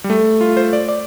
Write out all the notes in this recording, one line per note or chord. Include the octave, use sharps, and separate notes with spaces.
G3
A3
F4
C5
D5
D5